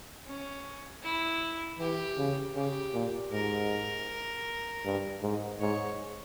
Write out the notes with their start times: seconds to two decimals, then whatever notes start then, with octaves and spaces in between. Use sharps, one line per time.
0.27 C#4
1.03 E4
1.79 E3 G4
2.18 C#3
2.55 C#3 G4
2.94 A#2
3.32 G#2 A#4
4.85 G2
5.22 G#2
5.61 G#2 C#5